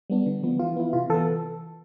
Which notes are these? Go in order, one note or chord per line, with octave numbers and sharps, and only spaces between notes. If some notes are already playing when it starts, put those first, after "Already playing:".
G3 B3 D4
D3
F3 B3
E3 F4
B3 E4
C3 F4
E3 B3 A4